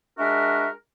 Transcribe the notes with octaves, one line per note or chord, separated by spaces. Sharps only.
G#3 D4 F#4 A#4 E5